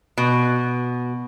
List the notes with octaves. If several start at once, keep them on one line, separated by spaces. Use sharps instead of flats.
B2